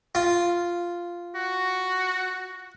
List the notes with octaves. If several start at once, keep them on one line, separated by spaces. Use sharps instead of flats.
F4
F#4